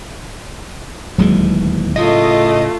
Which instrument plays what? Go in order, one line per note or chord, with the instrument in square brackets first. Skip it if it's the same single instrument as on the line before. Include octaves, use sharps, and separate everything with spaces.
[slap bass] D1 D#2 E3 [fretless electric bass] F#3 G#3
[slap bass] A2 C#3 [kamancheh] A3 F4 [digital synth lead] D#5